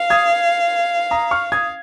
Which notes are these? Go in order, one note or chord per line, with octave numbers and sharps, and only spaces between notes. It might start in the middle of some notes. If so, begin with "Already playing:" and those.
Already playing: F5
D#6 G#6
A#5 D#6
C#6 F6
D#6 G#6